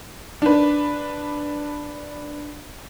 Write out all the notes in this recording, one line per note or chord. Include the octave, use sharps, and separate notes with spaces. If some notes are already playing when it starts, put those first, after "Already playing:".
D4 B4